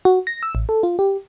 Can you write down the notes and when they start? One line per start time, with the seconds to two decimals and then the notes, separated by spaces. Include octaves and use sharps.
0.05 F#4
0.27 A#6
0.43 E6
0.55 A1
0.69 A4
0.83 F4
0.99 G4